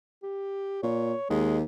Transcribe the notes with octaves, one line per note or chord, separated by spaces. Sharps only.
G4
A#2 C#5
D#2 G#3